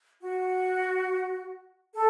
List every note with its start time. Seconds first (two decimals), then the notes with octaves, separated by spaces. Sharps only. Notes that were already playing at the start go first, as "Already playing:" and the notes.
0.21 F#4
1.94 A4